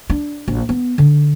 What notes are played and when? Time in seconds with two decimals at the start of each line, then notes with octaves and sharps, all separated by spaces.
0.10 D4
0.48 A#1
0.69 B3
0.98 D3